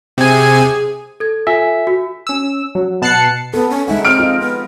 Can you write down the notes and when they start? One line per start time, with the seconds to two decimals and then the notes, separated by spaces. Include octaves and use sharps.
0.18 C3 G#4 G#5
1.20 A4 G#6
1.47 F4 A4 E5 G#5
1.87 F#4
2.27 C#4 E6
2.75 F#3
3.02 B2 A5 F#6 C7 C#7
3.54 B3 A4
3.70 C#4
3.88 G#3 D#4 E5 F#5
4.05 C4 F6 D7
4.19 F4 D#5
4.40 B3